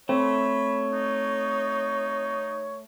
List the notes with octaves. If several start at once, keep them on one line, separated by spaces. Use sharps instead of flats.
A3 C4 C#5 B5
D#4